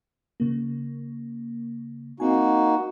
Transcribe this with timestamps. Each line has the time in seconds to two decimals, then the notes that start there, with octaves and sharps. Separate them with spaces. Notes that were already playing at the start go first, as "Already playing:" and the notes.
0.40 C#3 A#3
2.20 A#3 C4 D#4 F#4 G#5